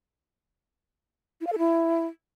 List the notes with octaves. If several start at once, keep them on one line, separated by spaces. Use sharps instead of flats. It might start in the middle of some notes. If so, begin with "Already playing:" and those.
E4
F5
A4
E4